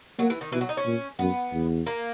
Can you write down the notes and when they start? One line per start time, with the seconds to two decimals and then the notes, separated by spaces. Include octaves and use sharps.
0.19 F#3 A#3
0.30 E3
0.41 D#3
0.52 B2 E3
0.61 F#3
0.69 D#4
0.77 C#4
0.86 A#2
1.19 F#2 B3
1.52 E2
1.86 A#3